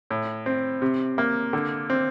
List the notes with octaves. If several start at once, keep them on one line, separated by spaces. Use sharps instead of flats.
A2
C4
C3
A#3
D3
C4